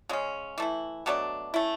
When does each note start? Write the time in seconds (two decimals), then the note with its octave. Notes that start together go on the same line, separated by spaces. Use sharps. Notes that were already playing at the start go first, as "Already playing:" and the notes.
0.09 C#3 G#3 C#4
0.58 E3 A3 E4
1.06 B2 F#3 A3 D4
1.54 A3 C#4 E4